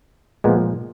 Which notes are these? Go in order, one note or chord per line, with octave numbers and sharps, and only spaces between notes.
A#2 F3 G#3 B3